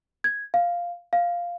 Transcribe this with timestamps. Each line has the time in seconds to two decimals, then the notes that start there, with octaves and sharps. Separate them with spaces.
0.24 G#6
0.54 F5
1.13 F5